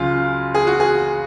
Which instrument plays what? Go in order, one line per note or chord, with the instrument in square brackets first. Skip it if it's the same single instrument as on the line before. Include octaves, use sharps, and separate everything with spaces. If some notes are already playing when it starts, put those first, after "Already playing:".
Already playing: [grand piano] C#2 C#3 F#3 F4
G#4
F#4
G#4